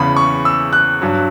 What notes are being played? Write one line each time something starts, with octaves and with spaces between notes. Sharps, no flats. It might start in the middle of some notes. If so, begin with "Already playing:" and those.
Already playing: E2 C#3 E3 B5
C#6
E6
F#6
G2 F#3